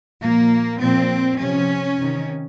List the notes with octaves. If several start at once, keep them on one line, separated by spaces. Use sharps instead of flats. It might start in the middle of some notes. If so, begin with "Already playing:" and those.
A#2 F3 A#3
A#2 F3 C4
C3 F3 C#4
C3 D#3